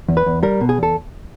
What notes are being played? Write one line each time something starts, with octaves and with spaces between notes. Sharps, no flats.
E2
B4
E2
G3 A#4
B2
G#4
E2 A4